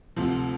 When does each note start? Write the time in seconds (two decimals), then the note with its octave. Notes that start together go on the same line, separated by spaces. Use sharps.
0.16 D2 C3 F3